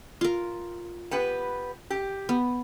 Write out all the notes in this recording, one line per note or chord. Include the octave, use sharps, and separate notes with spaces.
F4 A#4
B3 G4 B4
G4
B3